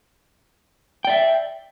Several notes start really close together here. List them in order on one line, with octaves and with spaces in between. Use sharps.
G5 D5 E5